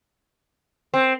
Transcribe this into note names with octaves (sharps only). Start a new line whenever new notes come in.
C4